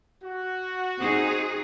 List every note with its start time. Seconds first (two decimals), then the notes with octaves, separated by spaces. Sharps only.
0.24 F#4
1.00 C4 D#4 G#4